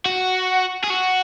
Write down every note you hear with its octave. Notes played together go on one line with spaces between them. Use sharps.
F#4
G#4
F#4